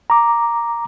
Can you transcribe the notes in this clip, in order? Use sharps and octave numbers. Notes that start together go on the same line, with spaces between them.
A#5 D6